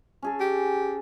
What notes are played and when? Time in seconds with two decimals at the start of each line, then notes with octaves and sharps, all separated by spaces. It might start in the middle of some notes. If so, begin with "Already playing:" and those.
0.22 C#4 G#4 A4
0.40 G4